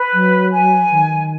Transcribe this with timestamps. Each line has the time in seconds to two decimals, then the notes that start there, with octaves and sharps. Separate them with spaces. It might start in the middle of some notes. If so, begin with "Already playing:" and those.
Already playing: B4
0.13 F#3
0.52 G#5
0.91 D#3